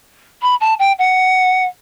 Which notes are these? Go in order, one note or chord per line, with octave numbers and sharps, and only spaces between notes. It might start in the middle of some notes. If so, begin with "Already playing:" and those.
B5
A5
G5
F#5